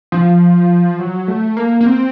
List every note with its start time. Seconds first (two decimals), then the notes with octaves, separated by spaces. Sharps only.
0.12 F3
1.00 F#3
1.28 A3
1.57 A#3
1.81 A#3
1.86 C4